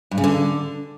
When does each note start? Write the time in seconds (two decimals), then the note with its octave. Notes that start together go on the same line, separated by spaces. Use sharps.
0.11 G2
0.18 C#3
0.24 D3